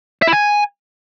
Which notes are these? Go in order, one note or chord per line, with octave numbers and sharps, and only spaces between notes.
E5
E4
G#5